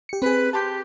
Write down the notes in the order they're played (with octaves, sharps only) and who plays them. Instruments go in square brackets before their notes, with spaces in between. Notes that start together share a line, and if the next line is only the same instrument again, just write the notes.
[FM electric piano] G4 C#7
[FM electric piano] C4 G#4 [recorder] B4
[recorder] G4 [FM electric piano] A5 C6 G6